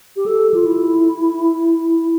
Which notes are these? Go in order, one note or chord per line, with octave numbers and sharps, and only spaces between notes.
G4
A4
F4
E4